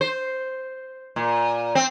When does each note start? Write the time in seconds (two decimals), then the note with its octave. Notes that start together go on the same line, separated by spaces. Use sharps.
0.01 C5
1.16 A#2
1.75 C4